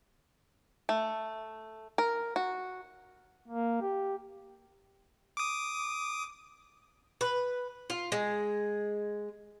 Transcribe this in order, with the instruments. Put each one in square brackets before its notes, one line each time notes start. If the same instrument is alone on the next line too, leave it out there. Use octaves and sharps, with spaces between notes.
[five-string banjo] A3
A#4
F#4
[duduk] A#3
G4
[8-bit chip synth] D6 D#6
[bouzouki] B4
F4
G#3